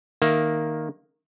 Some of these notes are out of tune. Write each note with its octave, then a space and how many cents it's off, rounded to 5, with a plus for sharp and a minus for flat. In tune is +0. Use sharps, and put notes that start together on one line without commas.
D#3 +0 A#3 +0 E5 +15